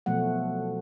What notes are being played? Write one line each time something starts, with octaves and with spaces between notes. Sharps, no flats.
B2 F3 F#3 A3 F#5